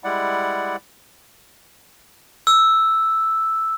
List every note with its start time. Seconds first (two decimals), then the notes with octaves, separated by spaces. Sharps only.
0.04 G3 G#3 E4 D5 F#5
2.47 E6